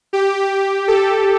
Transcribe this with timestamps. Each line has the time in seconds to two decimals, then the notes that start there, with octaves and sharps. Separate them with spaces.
0.13 G4
0.88 A4